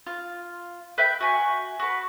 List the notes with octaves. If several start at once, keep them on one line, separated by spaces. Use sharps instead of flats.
F4
B4 E5 G5 G6
F#4 G#5
F#4 B4